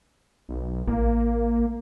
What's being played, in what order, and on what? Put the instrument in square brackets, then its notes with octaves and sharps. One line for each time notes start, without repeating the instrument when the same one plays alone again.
[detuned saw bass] B1
[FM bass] A1 [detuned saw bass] A#3